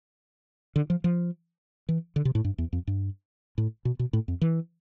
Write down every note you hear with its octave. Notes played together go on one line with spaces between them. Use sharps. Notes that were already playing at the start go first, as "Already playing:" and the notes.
D3
F3
F3
E3
D3
C3
A2
G2
E2
F2
G2
A2
B2
B2
A2
F2
E3